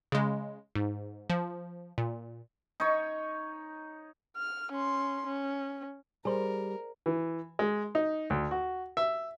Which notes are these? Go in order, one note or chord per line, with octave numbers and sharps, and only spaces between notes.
C#3 G#3
G#2
F3
A#2
D#4 C#5
F6
C#4 C6
C#4
G3 G#4 A#4 C5
E3
G#3
D#4
D2
F#4
E5